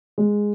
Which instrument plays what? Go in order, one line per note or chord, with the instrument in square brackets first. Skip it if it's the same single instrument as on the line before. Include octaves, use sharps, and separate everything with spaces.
[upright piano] G#3